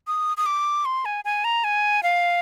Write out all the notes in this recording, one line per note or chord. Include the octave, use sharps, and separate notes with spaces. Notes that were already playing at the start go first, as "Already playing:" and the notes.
D#6
D#6
D6
C6
G#5
G#5
A#5
G#5
F5